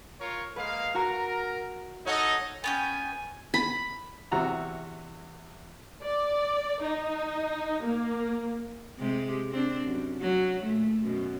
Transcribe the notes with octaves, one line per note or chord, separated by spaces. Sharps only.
F4 A#4 C#5
G#3 A#3 B4 F5
F#4 A#4 A#5
D#4 A4 C#5 D#5 F#5
B3 C#4 G5 G#5
B5
E2 C3 F#4 A#5 E6
D5
D#4
A#3
C3 G#3 G4
C4 D4
F#2
F#3
A#2 A3
F#2 B2